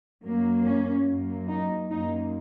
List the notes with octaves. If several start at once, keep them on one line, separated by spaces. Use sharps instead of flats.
F#2 F#3 A#3
C#4
F#2 F#3 A#3
D#4
F#2 F#3 A#3 D#4